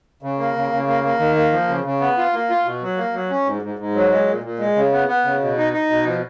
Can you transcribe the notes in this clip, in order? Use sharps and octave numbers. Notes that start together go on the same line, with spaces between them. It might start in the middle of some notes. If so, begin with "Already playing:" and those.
C#3
A#3
C#3
C#3
A#3
A#3
D#3
A#3
F3
C#3
C#3
B3
F4
A#3
F4
B2
F#3
A#3
F#3
C#4
G#2
G#2
G#2
F#3
G#3
A#2
A#2
G#3
C#3
B3
B3
C#3
B2
D#4
D#4
B2
F3